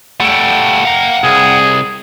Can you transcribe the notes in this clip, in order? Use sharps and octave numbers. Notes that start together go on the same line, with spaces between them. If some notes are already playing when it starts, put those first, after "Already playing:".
G3 A3 F#5 G5
F5 A#5
C2 G#4